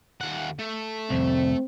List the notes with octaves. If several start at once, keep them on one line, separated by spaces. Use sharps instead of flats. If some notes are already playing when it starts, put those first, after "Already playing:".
D#2 F#5
A3
C2 F2 C4